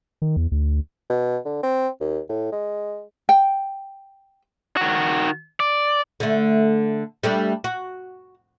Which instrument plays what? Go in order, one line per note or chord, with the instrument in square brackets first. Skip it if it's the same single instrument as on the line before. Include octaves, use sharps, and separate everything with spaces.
[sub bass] D#3
E2
D2
[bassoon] B2
D3
C4
D#2
A2
G#3
[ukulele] G5
[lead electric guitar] D#3 F#4
D5
[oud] D3 A3
G3 A3 D4
F#4